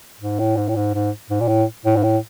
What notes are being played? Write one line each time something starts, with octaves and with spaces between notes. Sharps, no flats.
G#2
A2
G#2
A2
G#2
G#2
G#2
A#2
A2
A2
G#2
A2